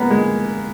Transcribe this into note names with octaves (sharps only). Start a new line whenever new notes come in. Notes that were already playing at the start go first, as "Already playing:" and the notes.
Already playing: G#3 A#3 B3
G#3